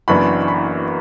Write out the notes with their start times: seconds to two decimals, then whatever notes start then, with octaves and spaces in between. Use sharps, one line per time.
0.08 F#1 F#2 E3 B3 D4 B5
0.48 B5